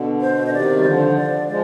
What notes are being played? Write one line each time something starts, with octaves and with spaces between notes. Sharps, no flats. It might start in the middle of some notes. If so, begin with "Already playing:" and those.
Already playing: B2 D3
C5
D3 D#5
C3 D#3 D5
G3
D3 F3 C5
D5
F3 G#3 D5